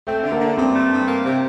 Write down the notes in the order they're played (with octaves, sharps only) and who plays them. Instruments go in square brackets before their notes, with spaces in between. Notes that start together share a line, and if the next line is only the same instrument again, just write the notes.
[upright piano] A3 [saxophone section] C4
[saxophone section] D3
[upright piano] A#3
[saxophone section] D3
[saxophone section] G2 [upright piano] C4
[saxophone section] A3
G2
A#3
C3